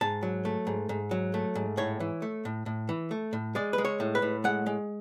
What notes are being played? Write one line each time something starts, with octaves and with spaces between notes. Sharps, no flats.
G#2 A5
F#3
A3
G#2
G#2
F#3
A3
G#2
A2 C#5
E3
A3
A2
A2
E3
A3
A2
G#3 D5
B4
G#3
C#5
A2
B4
A2
G#3 F#5
G#3